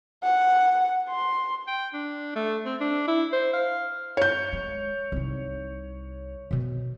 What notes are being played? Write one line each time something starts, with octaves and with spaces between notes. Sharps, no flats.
F#5
C6
G5
D4
A3
C4
D4
E4
C5
F5
C#5 G6
G#3
C2 D#4
B2 D#3